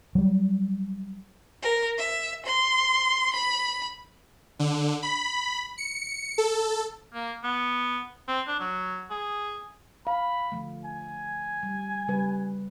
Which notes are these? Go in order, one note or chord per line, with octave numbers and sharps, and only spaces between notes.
F#3 G3
A#4
E5
C6
B5
D3
B5
C#7
A4
A#3
B3
C4
D4
F#3
G#4
F5 B5
D3 F3 A3
G#5
G3
C#3 G3 B4